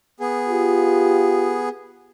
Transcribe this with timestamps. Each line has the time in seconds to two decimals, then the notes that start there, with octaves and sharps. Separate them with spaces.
0.20 B3 G#4
0.49 F4 G4